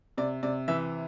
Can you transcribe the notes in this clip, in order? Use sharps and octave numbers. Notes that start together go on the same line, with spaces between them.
C3 D5
C3 D5
E3 E5